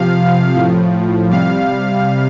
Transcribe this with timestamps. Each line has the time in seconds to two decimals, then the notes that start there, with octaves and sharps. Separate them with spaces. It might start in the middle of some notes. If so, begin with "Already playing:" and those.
Already playing: C3 F3 F5
0.55 A2 F3
1.30 C3 G3 F5